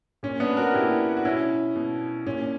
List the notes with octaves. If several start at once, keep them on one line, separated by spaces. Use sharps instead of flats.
A#2 C#4
B3 D4
F#4 A#4
A#2 E4 G4
F#4
B2 C#4 E4
B2
A#2 C#4